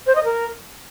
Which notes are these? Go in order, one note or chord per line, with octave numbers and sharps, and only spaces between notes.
C5
D#5
A#4